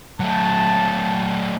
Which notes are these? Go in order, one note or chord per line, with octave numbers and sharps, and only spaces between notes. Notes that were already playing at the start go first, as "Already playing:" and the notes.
F#3 A3 A5